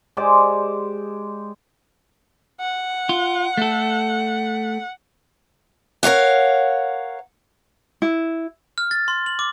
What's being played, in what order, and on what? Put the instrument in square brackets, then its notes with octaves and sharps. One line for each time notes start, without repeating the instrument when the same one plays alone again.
[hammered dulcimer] G#3 G4 C5 D5
[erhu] F#5
[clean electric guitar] F4
A3 A4
[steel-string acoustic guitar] A#4 C#5 F5 F#5
[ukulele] E4
[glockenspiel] F6
A6
C6
F#7
D6